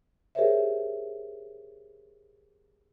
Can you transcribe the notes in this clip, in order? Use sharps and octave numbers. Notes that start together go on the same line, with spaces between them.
G4 G#4 A#4 C5 C#5 E5